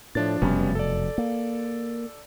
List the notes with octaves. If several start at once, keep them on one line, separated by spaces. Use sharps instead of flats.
A2 F3 D4 A6
F1 F#2 B2 G3 B3 C#4
A4 D5
A#3